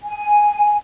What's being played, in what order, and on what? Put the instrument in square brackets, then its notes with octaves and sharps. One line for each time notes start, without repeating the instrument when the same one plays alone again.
[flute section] G#5